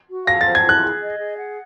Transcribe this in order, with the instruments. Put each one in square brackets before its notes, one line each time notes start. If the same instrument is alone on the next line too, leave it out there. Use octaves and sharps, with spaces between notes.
[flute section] F#4
[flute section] F5 [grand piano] A#6
[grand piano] A6
[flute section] C5
[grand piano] G#6
[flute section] E4 [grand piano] F#6
[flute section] G#4
D#5
G#4
F#5